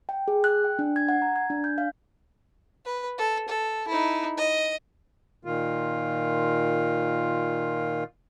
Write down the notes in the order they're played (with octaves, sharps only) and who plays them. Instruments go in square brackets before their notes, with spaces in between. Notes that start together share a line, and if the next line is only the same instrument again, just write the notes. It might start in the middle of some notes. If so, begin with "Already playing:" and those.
[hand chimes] G5
G#4
F#6
G5
D4
G#6
F#5
A#5
G#6
D4
G6
F5
[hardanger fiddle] B4
A4
A4
D#4 E4
D#5
[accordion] A#2 D#3 F4